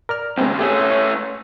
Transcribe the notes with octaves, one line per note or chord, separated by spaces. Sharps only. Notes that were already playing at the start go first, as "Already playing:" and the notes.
A#4 D5 F6
D#2 C#3 G#3 B3 C4
A3 C#4 G4 G#4 E5
C#5